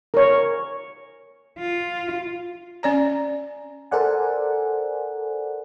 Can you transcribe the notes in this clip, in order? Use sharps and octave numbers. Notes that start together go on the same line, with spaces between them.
A#4 C#5
F4
C#4 D5 A#5
A4 A#4 C5 D5 F#5 G#5